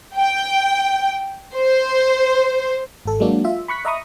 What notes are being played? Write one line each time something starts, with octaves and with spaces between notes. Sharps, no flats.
G5
C5
G#1 A4
F#3 G#3 A#3 D4 F#4
F4 E5
B5 C#6 F#6 B6
D#5 E5 A#5 B5 C#6 D#6